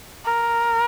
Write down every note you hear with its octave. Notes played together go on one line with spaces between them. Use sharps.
A#4